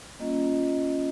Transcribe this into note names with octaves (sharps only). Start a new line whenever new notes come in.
G3 A#3 C#4 F4 D#5
D#5